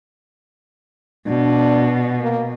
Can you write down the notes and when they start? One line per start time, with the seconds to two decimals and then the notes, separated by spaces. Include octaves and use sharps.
1.27 B2 D4
2.21 A#3